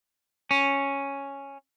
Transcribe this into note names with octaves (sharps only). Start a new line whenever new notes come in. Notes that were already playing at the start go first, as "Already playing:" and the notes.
C#4